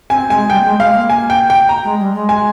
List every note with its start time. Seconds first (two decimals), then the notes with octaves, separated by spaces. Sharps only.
0.10 C4 G#5
0.30 G#3 G#5
0.50 G3 G5
0.60 A#3
0.65 G#3
0.80 G#3 F5
0.95 A#3
1.10 G#5
1.30 G5
1.50 G5
1.69 A#5
1.84 G#3
1.99 G3
2.14 G#3
2.29 G#5